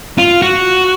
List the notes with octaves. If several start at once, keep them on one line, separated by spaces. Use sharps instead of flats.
F4
F#4